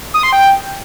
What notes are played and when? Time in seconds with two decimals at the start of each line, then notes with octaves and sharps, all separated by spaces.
0.14 D#6
0.23 C6
0.33 G5